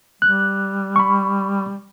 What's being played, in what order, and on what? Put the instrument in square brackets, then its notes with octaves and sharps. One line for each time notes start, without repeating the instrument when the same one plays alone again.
[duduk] G3 [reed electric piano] F#6
[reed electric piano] B5 C#6